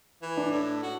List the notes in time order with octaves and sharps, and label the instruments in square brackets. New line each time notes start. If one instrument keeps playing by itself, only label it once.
[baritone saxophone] E3
[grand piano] D4
[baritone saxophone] A2
F#4